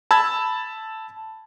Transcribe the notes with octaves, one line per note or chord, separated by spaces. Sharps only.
A5 B5 E6 G#6